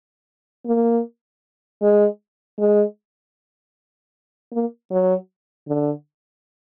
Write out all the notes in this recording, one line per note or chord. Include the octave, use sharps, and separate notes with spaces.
A#3
G#3
G#3
A#3
F#3
D3